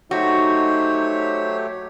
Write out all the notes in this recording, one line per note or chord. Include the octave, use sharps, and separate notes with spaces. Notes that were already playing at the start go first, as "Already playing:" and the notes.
F#3 A3 D#4 F#4 G4 C5 C#5